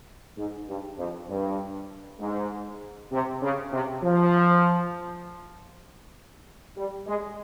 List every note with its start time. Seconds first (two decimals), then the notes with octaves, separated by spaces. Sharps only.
0.37 G#2
0.68 G2
0.98 F2
1.29 G2
2.20 G#2
3.12 C3
3.42 C#3
3.72 C3
4.03 F3
6.77 G3
7.07 G#3